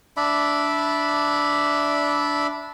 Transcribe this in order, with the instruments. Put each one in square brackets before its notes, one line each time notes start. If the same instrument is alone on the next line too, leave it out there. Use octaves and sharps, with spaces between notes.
[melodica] D4 D5 E5 B5